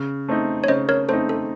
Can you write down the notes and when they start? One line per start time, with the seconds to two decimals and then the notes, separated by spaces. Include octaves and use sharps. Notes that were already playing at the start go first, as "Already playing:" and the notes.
Already playing: C#3
0.28 A3 C4 D#4
0.64 C#5
0.68 C#3 C5 D#5
0.89 A#4 C#5
1.09 A3 C4 D#4 A4 C5
1.29 A4